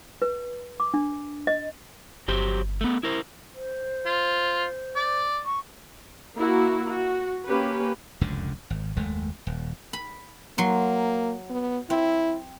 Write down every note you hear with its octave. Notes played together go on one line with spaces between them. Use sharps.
B4
D6
D4
D#5
G1 F#3 G4 C5
A3 B3
E4 A#4 C5
C5
F4
D5
C#6
A#3 E4 F#4
F#4
A#3 C#4 G4 B4
F1 C#2 F#2 D3
G#1
F#1 D#2 G#3 A3
D#1
B5
F#3 A#3 C6
B3
C4 E4